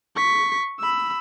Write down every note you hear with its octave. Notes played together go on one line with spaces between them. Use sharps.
C#6 B6
B5 E6